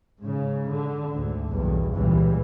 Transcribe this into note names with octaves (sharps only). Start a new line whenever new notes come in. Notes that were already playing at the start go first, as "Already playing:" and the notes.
G#2 C#3
D3
D2 G#2
F#1 B1 E2 G2
C#2 A#2 E3 G3